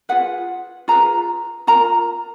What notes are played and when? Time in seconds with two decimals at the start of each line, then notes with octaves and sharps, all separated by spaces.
0.09 F4 G#4 B4 F#5
0.88 F4 G#4 B4 A#5
1.67 F4 A#4 A#5